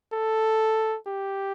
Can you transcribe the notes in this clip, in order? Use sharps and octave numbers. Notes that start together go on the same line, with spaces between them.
A4
G4